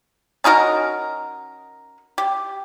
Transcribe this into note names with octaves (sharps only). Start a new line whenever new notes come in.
C#4 D#4 F#4 A#4
G4